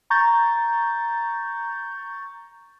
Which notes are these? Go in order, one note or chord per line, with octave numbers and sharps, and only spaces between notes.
A#5 C#6 G6 A6